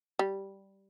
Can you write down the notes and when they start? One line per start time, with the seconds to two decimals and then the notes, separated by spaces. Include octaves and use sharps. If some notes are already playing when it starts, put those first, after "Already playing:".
0.19 G3